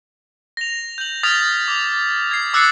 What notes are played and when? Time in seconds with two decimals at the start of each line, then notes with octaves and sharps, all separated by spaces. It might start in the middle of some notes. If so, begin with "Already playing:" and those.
0.57 A#6 F7
0.98 G6 F#7
1.23 D#6 F6 G#6 A6 B6 F7
1.68 D6
2.31 G#6 C7
2.54 D6 E6 F#6 A6 C7 C#7